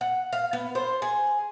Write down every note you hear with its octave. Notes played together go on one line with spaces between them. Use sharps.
F#5
F5
B3
C5
G#4